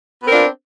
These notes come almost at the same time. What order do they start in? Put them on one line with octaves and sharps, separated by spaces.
B3 C4 A#4 D4 F4